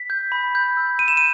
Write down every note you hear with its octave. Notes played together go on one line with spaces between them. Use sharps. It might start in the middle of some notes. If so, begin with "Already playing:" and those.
Already playing: B6
G6
B5
G6
E6
B5 D#7
E7
D#7